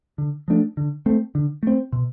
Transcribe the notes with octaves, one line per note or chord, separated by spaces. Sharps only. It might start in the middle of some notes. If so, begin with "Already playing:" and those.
D3
F3 A3 D4
D3
A3 C4
D3
A3 C4
B2